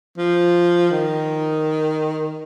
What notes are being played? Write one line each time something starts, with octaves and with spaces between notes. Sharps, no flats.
F3
D#3